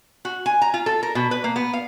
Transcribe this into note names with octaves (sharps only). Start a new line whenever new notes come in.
F#4
G#5
A#5
F4
A4
A#4
B2
B4
A#3
B3
F5